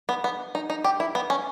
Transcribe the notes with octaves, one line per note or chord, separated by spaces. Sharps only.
B3
B3
D#4
D#4
G4
E4
B3
C#4